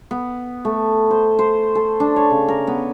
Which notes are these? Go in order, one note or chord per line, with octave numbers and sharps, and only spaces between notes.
B3
A3
C5
C5
A4
D4
C#5
C#3
A#4
B3